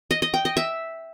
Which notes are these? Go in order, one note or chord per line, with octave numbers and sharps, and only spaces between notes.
D#5
D#5
G5
D#5
E5